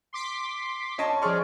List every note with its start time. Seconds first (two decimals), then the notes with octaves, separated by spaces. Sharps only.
0.13 C6 D6 B6
0.98 C#4 D#5 A5
1.22 F3 G#4 D5 C6 C#6 F6